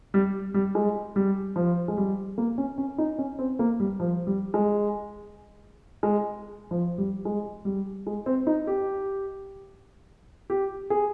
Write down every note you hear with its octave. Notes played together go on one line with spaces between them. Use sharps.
G3
G3
G#3
G3
F3
G#3
G3
A#3
C#4
C#4
D#4
C#4
C4
A#3
G3
F3
G3
G#3
G#3
F3
G3
G#3
G3
G#3
C4
D#4
G4
G4
G#4